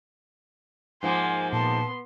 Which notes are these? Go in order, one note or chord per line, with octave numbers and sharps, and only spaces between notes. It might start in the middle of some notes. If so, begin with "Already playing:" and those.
G#2 F3 A#3 G#5 C6
A#2 B3 A5 C6